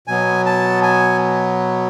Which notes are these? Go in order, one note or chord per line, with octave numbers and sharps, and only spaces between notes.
B2 F#3 B3 G#5
A5
G#5